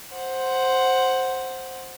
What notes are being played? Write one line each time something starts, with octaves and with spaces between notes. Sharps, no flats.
C5 F#5